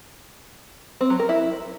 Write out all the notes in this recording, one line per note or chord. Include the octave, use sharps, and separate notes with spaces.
C4
F#3
A#4
E4